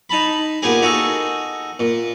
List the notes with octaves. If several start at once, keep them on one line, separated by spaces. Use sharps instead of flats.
D#4 A5 B5
A#2 B3 G4 G#4 G#5
D#4 F#4 G#4 A4
A#2